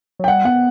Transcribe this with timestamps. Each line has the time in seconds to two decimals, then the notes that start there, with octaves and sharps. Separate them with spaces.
0.19 F#3
0.24 G5
0.28 G3 F#5
0.45 B3 F#5